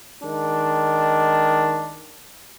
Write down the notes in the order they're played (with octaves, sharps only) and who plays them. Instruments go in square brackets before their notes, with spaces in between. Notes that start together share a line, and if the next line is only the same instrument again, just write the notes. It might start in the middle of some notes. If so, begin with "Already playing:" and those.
[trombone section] D#3 G#3 D4